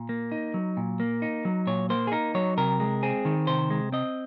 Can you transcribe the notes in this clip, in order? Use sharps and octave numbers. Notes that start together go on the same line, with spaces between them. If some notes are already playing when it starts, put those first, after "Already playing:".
Already playing: A#2
A#3
D#4
F#3
A#2
A#3
D#4
F#3
A#2 C#5
A#3 C5
G#4
D#4 A#4
F#3 C#5
C3 A#4
G#3
C4 G#4
D#3
C3 C5
G#3
C4 D#5